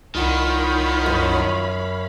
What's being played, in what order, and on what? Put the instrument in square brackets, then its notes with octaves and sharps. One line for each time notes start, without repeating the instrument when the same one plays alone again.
[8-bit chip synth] C2 F4 F#5 [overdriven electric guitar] D#3 [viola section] C#5 F5 B5
[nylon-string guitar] F#2